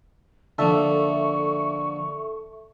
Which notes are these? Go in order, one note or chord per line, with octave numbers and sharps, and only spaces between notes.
D3 F3 A#3 A4 E5 C#6